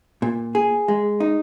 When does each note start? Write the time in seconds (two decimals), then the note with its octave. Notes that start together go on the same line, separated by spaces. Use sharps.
0.22 A#2
0.55 G#4
0.88 G#3
1.20 D#4